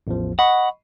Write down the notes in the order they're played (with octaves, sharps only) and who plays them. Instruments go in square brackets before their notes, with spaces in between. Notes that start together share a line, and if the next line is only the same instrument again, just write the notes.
[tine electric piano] A1 E2 F3
[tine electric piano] D#5 B5 C#6 [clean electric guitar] F#5